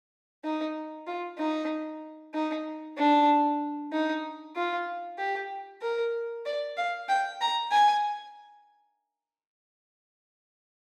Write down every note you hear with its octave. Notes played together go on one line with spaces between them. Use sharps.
D#4
F4
D#4
D#4
D4
D#4
F4
G4
A#4
D5
F5
G5
A#5
G#5